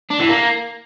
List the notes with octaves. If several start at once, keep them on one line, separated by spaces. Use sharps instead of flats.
D4
E3
A#3